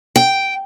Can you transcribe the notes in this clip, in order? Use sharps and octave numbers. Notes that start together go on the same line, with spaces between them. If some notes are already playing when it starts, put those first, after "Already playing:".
G5